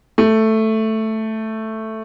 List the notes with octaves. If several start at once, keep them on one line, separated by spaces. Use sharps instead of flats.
A3